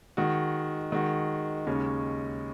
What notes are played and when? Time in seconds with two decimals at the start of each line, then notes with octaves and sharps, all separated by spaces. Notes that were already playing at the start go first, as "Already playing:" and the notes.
0.17 D#3 G#3 F#4
0.92 D#3 G#3 F#4
1.67 D#2 C#3 G#3 C#4